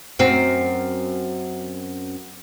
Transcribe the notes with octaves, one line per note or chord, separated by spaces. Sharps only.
F#2 C4